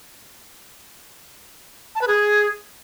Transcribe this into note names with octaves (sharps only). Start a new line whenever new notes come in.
A5
B4
G#4